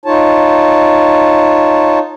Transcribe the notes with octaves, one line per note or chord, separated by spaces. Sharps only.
D#4 F4 C#5 A5